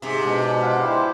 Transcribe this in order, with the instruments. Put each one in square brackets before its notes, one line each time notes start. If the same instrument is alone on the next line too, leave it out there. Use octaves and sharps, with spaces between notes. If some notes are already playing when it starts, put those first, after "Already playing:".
[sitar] G#2 C3 [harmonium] G#4
[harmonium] B2 G#3 D4
[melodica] F4 F5 F#5
E4 G4 C5